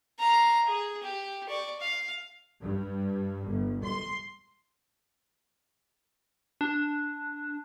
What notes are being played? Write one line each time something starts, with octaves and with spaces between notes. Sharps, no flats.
F5 A#5
G#4
G4
D5 C#6
F5
G2
G1
C6
D4